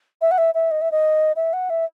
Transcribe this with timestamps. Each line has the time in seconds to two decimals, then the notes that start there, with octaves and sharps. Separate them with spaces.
0.21 E5
0.31 F#5
0.38 E5
0.54 E5
0.71 D#5
0.81 E5
0.91 D#5
1.36 E5
1.53 F#5
1.70 E5